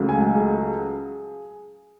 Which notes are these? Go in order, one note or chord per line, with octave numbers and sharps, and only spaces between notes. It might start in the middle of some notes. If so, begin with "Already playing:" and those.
Already playing: C#2 C#3 F#3 A3
G#5
F#5
G#4 G#5